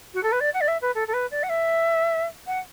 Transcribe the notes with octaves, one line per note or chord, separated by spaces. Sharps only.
F#4
A4
B4
D5
F#5
D5
E5
B4
A4
A4
B4
D5
F#5
E5
F#5